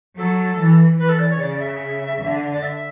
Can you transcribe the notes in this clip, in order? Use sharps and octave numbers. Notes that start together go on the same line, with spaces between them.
F#3 A4
E3
E3 B4
A4
D5
C#5
C#3 D5
E5
D3
D5
E5